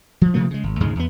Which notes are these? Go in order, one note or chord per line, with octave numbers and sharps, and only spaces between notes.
F3
C3 F3 A3 A#3
C#3 G#3
G#1
D2 G#2 C#3 G#3
E2 B3